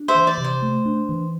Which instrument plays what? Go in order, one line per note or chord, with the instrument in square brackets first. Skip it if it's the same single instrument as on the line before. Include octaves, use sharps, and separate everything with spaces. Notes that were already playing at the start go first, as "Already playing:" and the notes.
Already playing: [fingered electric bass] D4
[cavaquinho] C5 E5
[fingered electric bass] E3
[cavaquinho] D5
[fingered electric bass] C3
[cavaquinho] C5
[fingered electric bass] A3
D4
E3